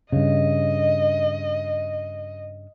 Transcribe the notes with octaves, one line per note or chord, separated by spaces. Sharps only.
G2 C#3 D#5